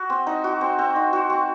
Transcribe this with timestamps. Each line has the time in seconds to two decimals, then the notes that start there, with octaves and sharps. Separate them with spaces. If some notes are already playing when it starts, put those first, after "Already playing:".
Already playing: F#4
0.10 C4
0.27 D#4
0.44 F#4
0.61 C4
0.78 C4
0.96 D#4
1.13 F#4
1.30 C4